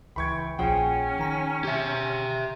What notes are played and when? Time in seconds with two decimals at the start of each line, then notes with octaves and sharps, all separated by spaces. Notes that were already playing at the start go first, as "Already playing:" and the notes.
0.16 C#2 E3 G5 B5 C#6 G#6
0.59 A#1 A#2 F3 C#4 G#4 F#5 G5
1.19 D#3 A#5 B6
1.65 G4 E5